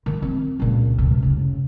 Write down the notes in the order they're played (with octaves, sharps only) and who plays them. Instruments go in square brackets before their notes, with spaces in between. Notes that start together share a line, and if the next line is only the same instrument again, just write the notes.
[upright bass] D#3
C4
C#2 A#2
D2 C3
F#1 C#3